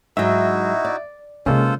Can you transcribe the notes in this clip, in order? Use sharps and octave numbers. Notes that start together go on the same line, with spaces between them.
G#2 F#3 D#4 E4 F#4 E5
D5
C3 D#3 G#3 A#3 C#4 F4 A4 C5